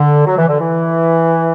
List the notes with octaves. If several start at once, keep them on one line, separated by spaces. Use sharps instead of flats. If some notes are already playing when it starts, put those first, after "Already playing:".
Already playing: D3
F#3
E3
D3
E3